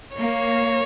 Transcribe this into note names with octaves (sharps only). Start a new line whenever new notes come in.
A#3 C#5